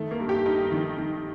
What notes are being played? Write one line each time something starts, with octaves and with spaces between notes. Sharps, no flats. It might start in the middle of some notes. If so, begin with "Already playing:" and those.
Already playing: D#3 A3
A#3
G2
G4
G2 D#4
D#3
D#3